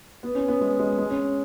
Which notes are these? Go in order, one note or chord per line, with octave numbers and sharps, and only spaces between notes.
B3
C#4
B3
G#3
G#3
G#3
C#4